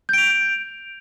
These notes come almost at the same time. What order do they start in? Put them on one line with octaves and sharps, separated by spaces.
G6 D7 F7